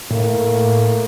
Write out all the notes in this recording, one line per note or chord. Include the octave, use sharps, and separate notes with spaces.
A2 A3 A#3